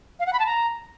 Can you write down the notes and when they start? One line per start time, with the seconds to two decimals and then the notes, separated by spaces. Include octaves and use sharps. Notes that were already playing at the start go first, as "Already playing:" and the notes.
0.20 F5
0.26 F#5
0.33 B5
0.39 A5
0.46 A#5